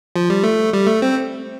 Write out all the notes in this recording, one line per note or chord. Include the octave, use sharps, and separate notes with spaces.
F3
G3
A3
G3
A3
C4